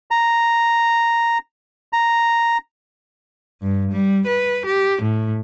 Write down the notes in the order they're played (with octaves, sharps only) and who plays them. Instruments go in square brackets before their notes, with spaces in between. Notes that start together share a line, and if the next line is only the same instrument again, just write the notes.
[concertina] A#5
A#5
[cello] G2
G3
B4
G4
A2